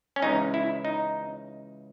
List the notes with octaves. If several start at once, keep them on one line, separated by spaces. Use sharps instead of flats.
C#4
C#2 C#3 E3 D#4
E4
D#4